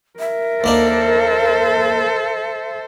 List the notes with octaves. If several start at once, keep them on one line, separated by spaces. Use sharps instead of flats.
A#4 E5
D#2 A#3 D4 A4 C5